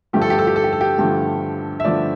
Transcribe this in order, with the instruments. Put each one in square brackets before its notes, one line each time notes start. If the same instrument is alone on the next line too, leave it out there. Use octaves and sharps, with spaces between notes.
[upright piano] G2 D3 F3 A3 G4
A4
G4
A4
G4
A4
G4
A4
G4
G2 D3 F3 A3 G4
E5
G2 D3 F3 A3 D5